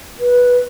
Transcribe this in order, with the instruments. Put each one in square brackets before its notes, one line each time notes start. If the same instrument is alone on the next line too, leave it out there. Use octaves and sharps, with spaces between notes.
[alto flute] B4